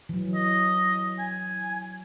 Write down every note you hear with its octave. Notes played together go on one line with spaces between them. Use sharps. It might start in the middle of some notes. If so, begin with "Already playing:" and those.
E3 F#3
D#5
G#5